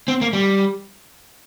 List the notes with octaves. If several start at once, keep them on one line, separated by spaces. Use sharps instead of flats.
C4
A#3
G3